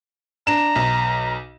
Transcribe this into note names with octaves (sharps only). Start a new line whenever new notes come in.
D4 A#5 E7
B1